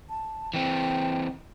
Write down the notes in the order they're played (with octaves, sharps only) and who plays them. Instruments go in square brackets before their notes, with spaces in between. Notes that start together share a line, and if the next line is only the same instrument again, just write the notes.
[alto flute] A5
[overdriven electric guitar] E3 C4 [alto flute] G5